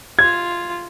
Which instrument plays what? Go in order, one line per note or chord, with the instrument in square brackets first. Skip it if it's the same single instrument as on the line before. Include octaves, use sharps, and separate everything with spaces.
[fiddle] F4 [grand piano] G#6